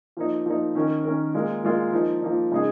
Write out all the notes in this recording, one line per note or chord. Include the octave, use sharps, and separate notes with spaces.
F3 A#3 D#4
F3 A#3 D#4
D#3 C#4 A#4
D#3 C#4 A#4
A#2 G#3 F4 A#4
A#2 G#3 F4 A#4
F3 A#3 D#4
F3 A#3 D#4
C#3 G#3 D#4 G#4